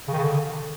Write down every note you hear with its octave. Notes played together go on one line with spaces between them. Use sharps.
C#3
D#3
C#3
D3